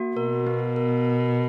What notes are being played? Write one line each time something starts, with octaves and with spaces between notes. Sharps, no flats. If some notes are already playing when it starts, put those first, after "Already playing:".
Already playing: A#3 F#4
B2 A#4
B3
A#4